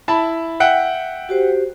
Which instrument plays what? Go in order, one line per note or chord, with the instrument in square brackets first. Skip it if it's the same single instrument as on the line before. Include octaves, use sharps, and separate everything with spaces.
[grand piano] E4 A5 B5
E5 F#5 G5
[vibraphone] F#4 G4 C5